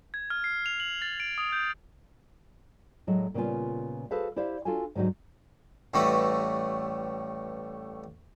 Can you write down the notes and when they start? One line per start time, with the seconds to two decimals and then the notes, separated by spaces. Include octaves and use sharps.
0.14 G#6
0.30 F6
0.44 C7
0.66 F7
0.80 F#7
1.02 A6
1.20 D7
1.38 D#6
1.52 G6
3.07 A2 F#3 G#3 D#5
3.34 A#2 C#3 G3 B3 F4 G#5
4.11 F#4 G#4 A4 B4 C5 F5
4.36 E4 G4 C5 D5 F5
4.65 D4 F4 F#4 A4 F5 G#5
4.95 G#2 D3 F#3 G3 D#4 F#4
5.94 A1 A2 G3 A3 F#4 B4